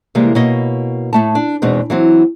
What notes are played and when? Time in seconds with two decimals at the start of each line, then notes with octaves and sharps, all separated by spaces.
0.15 C3 E3 G3 G#3 A#3
0.35 B2 A#3 E4 C#5 D#5
1.13 A2 A3 A5
1.35 D4
1.62 E2 B2 G#3 C4 D#4
1.90 E3 F#3 C4